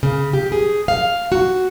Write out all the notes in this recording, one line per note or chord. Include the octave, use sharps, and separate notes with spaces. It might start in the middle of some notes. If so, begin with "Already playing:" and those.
C#3
G4
G#4
F5
F#4